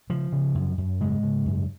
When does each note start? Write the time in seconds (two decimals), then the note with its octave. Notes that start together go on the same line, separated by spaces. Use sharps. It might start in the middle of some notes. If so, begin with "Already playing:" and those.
0.10 C#3 F3
0.32 C#3
0.55 F#2
0.78 F#2
1.00 G#2 C#3 G#3
1.23 C#3
1.45 F#2